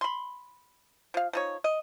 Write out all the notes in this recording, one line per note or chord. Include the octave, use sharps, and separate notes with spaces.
B5 C6
F3 F5
F3 D#4 C#5
D#5